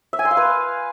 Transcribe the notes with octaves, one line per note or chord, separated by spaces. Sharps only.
E5
G#5
C6
F5
B4